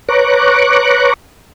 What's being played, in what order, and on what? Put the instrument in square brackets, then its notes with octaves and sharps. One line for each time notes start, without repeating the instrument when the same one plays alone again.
[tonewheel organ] B4 C#5 A#5 C#6 D6 F#6